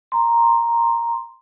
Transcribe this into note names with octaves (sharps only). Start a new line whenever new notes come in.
A#5 C6